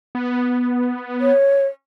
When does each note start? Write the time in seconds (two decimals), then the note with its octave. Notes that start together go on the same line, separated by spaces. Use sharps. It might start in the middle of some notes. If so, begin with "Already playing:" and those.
0.15 B3
1.20 C#5